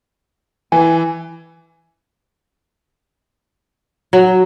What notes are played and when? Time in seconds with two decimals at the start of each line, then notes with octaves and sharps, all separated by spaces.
0.72 E3 G#5
4.13 F#3